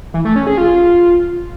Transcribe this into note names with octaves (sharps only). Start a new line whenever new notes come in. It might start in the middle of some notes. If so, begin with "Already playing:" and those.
E3
A3
C#4
G#4
F4